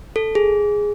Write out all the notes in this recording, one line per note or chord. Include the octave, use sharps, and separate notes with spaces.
A4
G#4